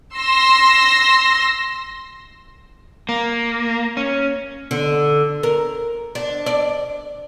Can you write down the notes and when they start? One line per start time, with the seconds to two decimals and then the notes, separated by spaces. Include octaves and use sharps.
0.14 C6 E6 A#6
3.09 A#3
3.97 C#4
4.71 D3
5.43 A#4
6.15 D4
6.46 D5